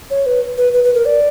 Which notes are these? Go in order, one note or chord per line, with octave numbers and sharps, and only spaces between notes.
C#5
B4
B4
B4
B4
A#4
D5